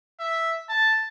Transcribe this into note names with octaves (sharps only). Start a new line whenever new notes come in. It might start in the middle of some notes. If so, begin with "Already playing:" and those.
E5
A5